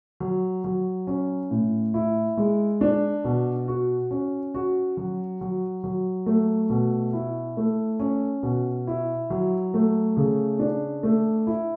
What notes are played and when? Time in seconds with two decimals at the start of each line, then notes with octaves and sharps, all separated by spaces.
0.20 F#3
0.64 F#3
1.07 C#4
1.51 A2
1.94 E4
2.37 G#3
2.81 D4
3.24 B2
3.68 F#4
4.11 C#4
4.54 F#4
4.97 F#3
5.41 F#3
5.84 F#3
6.26 A3
6.70 B2
7.13 E4
7.57 A3
8.00 C#4
8.43 B2
8.87 E4
9.30 F#3
9.74 A3
10.17 C#3
10.59 D4
11.03 A3
11.47 E4